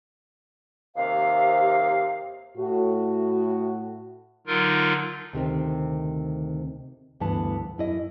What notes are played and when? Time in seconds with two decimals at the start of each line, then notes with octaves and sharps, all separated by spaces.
0.97 D#2 C3 F5
2.58 A2 F#4
4.47 D3 F#3 D#4 F4 A#4
5.33 D2 C3 D#3 C4
7.20 D2 G2 E3 B3 A5
7.78 F#2 E4 D#5